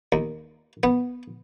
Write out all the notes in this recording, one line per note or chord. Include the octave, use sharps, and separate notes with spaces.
D#2
B3